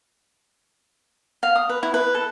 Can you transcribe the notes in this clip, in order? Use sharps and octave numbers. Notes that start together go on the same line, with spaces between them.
F5
D#6
B4
E4
B4
A4